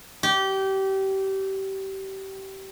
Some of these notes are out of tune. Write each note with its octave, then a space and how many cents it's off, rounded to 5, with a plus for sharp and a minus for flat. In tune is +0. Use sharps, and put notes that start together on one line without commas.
G4 -25